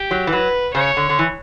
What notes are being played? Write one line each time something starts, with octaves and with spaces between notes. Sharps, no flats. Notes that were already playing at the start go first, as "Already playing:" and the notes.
Already playing: G4
F#3
E3
F#3 B4
C#3 C#5
D3
D3
E3